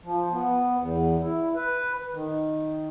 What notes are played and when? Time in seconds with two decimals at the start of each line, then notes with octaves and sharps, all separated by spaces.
0.04 F3
0.31 B3
0.77 E2
1.21 E4
1.55 B4
2.12 D#3